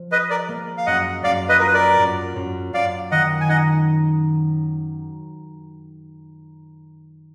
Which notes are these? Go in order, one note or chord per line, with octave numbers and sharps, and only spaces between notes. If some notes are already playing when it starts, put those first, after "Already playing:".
Already playing: F3
G#4 B4 D#5
A#4 D5
A#3
F5
F#2 D#5 F#5
F#2 D5 F5
B4 D#5
F4 A#4
B4
A#4 D5
F#2
F#2
F#2 D5 F5
D#3 D#5 F#5
G#5
D#4 D#5 F#5